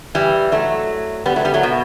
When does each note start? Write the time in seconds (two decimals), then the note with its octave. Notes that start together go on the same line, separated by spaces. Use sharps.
0.15 E3 G3
0.52 F#3 A3
1.26 G3 B3
1.36 F#3 A3
1.45 G3 B3
1.54 F#3 A3
1.63 B2